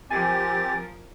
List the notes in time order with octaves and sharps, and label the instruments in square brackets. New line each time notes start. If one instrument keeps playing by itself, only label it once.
[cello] F3 A#4 [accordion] C4 G4 [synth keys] G#5 [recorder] A6